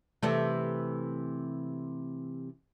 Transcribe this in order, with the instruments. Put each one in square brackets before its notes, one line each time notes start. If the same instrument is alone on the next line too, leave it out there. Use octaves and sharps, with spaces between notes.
[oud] C3 E3 A3